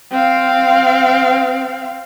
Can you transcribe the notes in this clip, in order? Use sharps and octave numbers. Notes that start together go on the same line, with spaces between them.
C4 F5